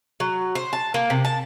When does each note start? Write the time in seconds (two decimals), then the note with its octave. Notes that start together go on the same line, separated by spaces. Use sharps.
0.20 F#3
0.55 C5
0.73 A5
0.94 A#3
1.10 C3
1.25 A5